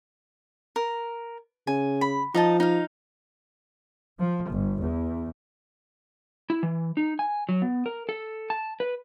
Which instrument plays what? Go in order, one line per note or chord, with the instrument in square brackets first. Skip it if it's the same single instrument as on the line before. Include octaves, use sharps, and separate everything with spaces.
[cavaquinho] A#4
[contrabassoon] C#3 [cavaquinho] G#5
[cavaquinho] B5
[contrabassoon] F3 [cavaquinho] D#4 D#5 A5
[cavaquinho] D#4 F5
[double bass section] F3
G1
E2
[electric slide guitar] E4
E3
D#4
G#5
F#3
B3
A#4
A4
A5
B4